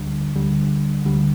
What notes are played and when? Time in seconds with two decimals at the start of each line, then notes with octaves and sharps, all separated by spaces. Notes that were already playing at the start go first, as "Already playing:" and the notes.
Already playing: D2 D3 G3
0.35 D2 D3 G3
1.05 D2 D3 G3